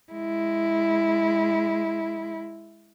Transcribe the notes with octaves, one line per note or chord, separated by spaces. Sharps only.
G#3 E4